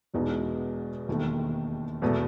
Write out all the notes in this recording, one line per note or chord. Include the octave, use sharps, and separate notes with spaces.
E1 E2 B2 G#3 D#4
E1 D#2 D#3 A3
E2 B2 A3